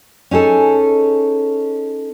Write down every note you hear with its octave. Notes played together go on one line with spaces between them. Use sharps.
C#4 D#4 G#4 A4